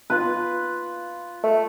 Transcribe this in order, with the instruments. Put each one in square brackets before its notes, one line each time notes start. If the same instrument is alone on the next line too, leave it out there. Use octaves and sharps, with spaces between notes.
[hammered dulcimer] F4 B4
[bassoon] A3